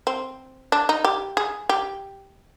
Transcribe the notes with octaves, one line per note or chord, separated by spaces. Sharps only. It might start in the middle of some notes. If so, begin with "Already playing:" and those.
C4
D4
D#4
G4
G#4
G4